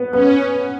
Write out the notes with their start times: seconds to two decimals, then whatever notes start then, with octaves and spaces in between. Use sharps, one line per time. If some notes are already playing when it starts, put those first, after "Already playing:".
Already playing: B3
0.13 B3 C#4